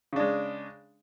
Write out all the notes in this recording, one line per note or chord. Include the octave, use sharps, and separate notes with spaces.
C#3 G#3 D4